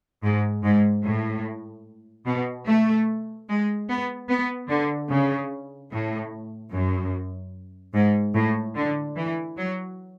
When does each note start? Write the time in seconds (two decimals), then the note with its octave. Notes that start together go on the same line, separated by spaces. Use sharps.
0.23 G#2
0.64 G#2
1.04 A2
2.26 B2
2.66 A3
3.48 G#3
3.88 B3
4.29 B3
4.69 D3
5.10 C#3
5.92 A2
6.73 F#2
7.94 G#2
8.34 A2
8.75 D3
9.16 E3
9.57 F#3